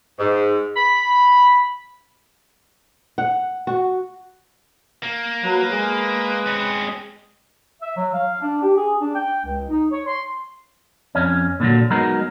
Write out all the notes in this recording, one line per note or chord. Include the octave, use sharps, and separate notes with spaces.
G#2
B5
F#5
F#4
A#3
F#3 B4
G#3 G#4
C4 C#4
E5
F#3
F5
D4
G4
G#4
D4
G5
C#2
D#4
C#5
C6
F2 C#4
A#2 D3 F3 F#3
F#3 G#3 B3 D#4 F#4 A#4